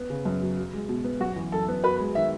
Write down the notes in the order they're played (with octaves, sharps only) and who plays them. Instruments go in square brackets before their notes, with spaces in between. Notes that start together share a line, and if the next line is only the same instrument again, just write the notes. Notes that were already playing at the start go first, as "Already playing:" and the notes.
Already playing: [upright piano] B3
C#3
F#2
F#3
F#4
G#3
B2
B3
[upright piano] F#2 [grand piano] F#4
[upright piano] E3
[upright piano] F#2 [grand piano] A4
[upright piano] B3
[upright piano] F#4 [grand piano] B4
[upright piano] G#3
[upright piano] D#3 [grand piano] E5